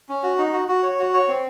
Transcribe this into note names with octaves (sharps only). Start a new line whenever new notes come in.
C#4
F#4
D#4
F#4
F#4
C#5
F#4
C#5
C4